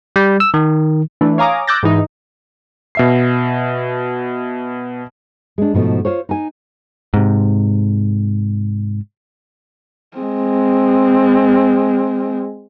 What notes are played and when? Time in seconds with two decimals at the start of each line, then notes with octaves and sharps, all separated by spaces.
0.16 G3
0.40 E6
0.54 D#3
1.21 E3 A3 D4
1.38 C#5 F5 G#5 A#5 D6 D#6
1.67 D6 E6 F#6 G6 A6 A#6
1.83 G#2 E3 D#4
2.95 B2 E5 C7
5.58 G#3 D4
5.74 G#2 B2 F3 A3
6.05 F4 C5 C#5
6.29 D#4 G#5
7.14 G#2 C3
10.17 G#3 C4